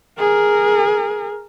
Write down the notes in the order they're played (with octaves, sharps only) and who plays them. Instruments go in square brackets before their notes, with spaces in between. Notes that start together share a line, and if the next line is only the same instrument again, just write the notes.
[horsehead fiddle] G#4 A#4